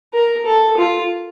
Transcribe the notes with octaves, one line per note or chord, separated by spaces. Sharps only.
A#4
A4
F4